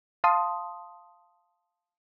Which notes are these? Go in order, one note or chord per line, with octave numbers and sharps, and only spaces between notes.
F5 A5 C6 D#6